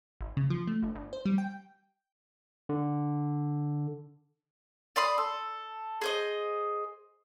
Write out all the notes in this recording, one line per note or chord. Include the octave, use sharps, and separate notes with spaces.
G#1
C#3
F3
A3
G1
G1
C5
G3
G5
D3
D5 B5 C6 D#6
A4
G#4 C5 D#5